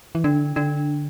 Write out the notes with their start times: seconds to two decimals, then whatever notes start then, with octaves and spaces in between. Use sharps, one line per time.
0.15 E3
0.24 D3 D4
0.56 D3 D4